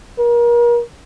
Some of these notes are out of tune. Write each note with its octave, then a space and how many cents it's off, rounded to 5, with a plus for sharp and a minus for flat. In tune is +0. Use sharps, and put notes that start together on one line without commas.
A#4 +35